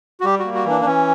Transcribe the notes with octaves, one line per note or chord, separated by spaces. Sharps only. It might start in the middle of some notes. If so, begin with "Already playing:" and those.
F#4
G3 G4
F#4
A#3
F#4
E3 D4
D4
E3 C#4